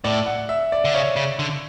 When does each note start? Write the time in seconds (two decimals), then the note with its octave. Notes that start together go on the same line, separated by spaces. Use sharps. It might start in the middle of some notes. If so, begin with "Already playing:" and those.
0.04 A2 D5
0.26 F#5
0.49 E5
0.72 D5
0.85 D3
0.94 C#3 C#5
1.16 C#3
1.39 D3